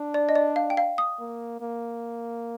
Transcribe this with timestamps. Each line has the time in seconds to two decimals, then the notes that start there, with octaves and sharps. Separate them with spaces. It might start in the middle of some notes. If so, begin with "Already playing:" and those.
Already playing: D4
0.14 D5
0.29 D#5
0.35 D5
0.56 F5
0.70 G5
0.77 F5
0.98 D#6
1.20 A#3
1.61 A#3